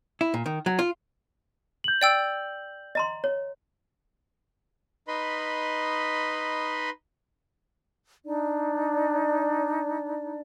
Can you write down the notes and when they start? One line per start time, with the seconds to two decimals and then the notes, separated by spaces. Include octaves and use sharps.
0.21 E4
0.34 A#2
0.46 D#3
0.66 F#3
0.79 F4
1.84 G6 F#7
2.01 D5 G5 E6
2.95 D#5 A#5 C6
3.24 C#5
5.08 D#4 B4 D#5 B5 C6
8.25 D4 D#4 D5